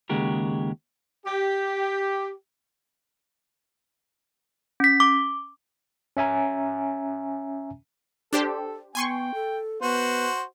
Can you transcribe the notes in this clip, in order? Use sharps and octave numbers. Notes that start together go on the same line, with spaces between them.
D#2 C#3 G#3 F#4 G4 A#4
G4
C#4 B6
D6
C#4 E5 G#5 A#5
D4 G4 A4 C5
B3 G5 G#5 C6 C#6
A4
B3 F#4 B4 C5